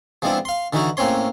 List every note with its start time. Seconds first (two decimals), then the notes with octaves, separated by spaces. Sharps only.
0.22 F3 G#3 B3 C4 D4 E4
0.45 F5 C6
0.73 D3 E3 D#4 E4 F#4
0.97 A2 A#3 C4 C#4 C#5 C6